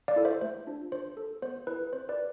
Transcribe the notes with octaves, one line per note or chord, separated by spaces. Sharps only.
D5 F5
E4 A4
C5 E5
A3 C5
D4 F4
D4 C5
A4
B3 C5
E4 A4 B4
C4 C5
B4 D5
F4